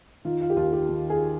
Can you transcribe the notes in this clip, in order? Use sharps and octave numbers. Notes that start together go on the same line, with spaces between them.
D#3 F4
F4
G4
D#2 F4
G4
D#3
G#4